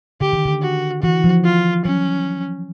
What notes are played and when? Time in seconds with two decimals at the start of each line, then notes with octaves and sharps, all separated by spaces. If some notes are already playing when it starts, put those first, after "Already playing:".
0.21 D3 G4
0.33 D#3
0.45 D3
0.63 F#4
1.02 E3 F#4
1.24 F3
1.45 F4
1.85 F#3 C#4